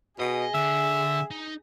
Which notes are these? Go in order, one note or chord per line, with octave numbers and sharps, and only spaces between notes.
B2 G#4 D#5
D3 E5
D#4